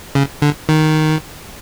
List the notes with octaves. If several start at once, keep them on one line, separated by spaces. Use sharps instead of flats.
C#3
D3
D#3